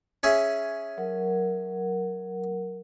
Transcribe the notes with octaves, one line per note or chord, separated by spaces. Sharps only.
C#4 G#4 E5
F#3 A#4 F#5